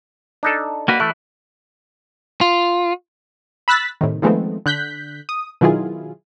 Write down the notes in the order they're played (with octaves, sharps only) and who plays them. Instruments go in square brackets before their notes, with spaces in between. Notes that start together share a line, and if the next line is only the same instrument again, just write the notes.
[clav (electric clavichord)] D4 D#4 A4
[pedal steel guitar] A#3 F#4 B4
[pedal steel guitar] E3 E4 F#6 [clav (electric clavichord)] A3
[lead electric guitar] F4
[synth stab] B5 E6 F#6 A6 B6
A2 C3 D#3
D#3 F3 G#3 A3 B3 C4
D3 F#6 G6 B6
D#6
B2 D#3 F#3 E4 F4 G#4